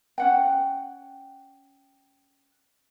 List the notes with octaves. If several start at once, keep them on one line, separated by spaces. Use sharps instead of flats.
C#4 F#5 G5